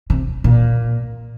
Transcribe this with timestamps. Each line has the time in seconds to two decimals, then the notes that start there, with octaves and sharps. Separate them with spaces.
0.10 C3
0.44 A#2